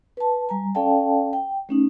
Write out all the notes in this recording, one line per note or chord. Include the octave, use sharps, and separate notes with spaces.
B4 A5
G3 G#5 A#5
C#4 A4 D5 F5 G5 A5
G5
A3 C#4 D#4